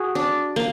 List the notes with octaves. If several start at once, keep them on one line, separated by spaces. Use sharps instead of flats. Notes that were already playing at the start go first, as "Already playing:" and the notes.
Already playing: F#4 G#4
D4
A#3